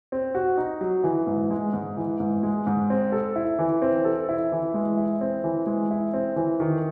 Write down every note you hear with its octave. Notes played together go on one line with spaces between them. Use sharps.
C4
F#4
D#4
F#3
E3
G#2
G#3
G#2
E3
G#2
G#3
G#2
C4
A4
E4
E3
C4
A4
E4
E3
G#3
E4
C4
E3
G#3
E4
C4
E3
D#3